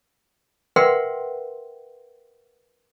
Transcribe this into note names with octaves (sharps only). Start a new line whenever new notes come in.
A#4 B4 E5 F#5 G5 C6